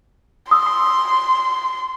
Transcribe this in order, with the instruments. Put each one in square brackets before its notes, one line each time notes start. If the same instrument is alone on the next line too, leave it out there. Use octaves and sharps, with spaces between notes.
[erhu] C6 [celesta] D#6 E6